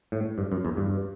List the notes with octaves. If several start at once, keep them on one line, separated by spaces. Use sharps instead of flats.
A2
G2
F#2
E2
G2